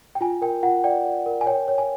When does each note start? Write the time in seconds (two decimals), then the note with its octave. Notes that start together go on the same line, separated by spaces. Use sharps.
0.15 G5
0.21 F4 G#5
0.42 A#4 G5
0.63 F4 F#5
0.84 D5 G5
1.05 D5
1.26 A#4
1.41 G#5
1.46 C#5 G5
1.68 C#5
1.78 G#5